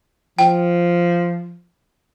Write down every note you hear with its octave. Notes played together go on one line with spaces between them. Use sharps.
F3 G5